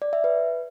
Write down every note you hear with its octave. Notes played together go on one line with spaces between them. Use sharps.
D5
E5
B4